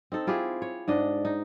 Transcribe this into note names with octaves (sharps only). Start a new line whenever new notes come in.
C4 D#4 A4
E4 F4 G4 G#4
C#5
G#2 D4 D#5
D#4